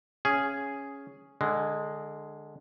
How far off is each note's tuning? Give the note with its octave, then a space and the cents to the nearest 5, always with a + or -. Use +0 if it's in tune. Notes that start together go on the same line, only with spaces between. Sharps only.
C#4 +0 G#4 +0 F5 -20
D3 +20 G#3 +0